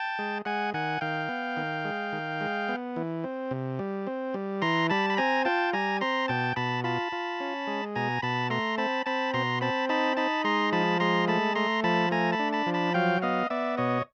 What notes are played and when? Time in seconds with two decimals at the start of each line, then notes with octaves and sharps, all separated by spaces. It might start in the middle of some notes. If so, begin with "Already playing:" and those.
Already playing: G5 A5
0.19 G#3
0.45 G#3 F#5 G#5
0.74 D#3 F#5 G#5
1.01 D#3 F5 G5
1.29 B3
1.57 D#3
1.85 G#3
2.13 D#3
2.41 G#3
2.69 B3
2.96 E3
3.24 C4
3.51 C3
3.79 G3
4.07 C4
4.34 G3
4.62 E3 A#5 C6
4.90 G3 A5 B5
5.10 B5
5.17 C4 G#5 A#5
5.45 F4 G5 A5
5.73 G3 G#5 A#5
6.01 C4 A#5 C6
6.28 B2 G5 A5
6.56 B2 A5 B5
6.84 F4 A5 B5
7.12 F4
7.40 C#4
7.67 G#3
7.95 B2 G#5 A#5
8.22 B2 A5 B5
8.50 A3 A#5 C6
8.78 C4 A5 B5
9.06 C4 A5 B5
9.34 B2 A#5 C6
9.61 C4 A5 B5
9.89 D#4 A5 B5
10.17 D#4 A5 B5
10.44 G#3 A#5 C6
10.72 F3 A5 B5
11.00 G#3 A#5 C6
11.28 A3 A5 B5
11.55 A3 A#5 C6
11.84 F3 A5 B5
12.11 A3 G#5 A#5
12.32 A5 B5
12.39 D4
12.52 A5 B5
12.66 F3
12.74 A5 B5
12.94 F#3 F5 G5
13.22 B3 D#5 F5
13.50 B3 D5 E5
13.77 B2 C#5 D#5